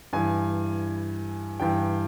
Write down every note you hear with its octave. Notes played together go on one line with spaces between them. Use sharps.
G2 E3 G#5
G2 E3 G5